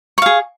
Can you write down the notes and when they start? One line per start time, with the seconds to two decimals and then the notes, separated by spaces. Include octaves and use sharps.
0.18 C#6
0.22 F5
0.26 G#4